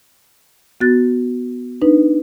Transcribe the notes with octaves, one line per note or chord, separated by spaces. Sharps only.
B3 F#4 F#6 A6
D4 D#4 B4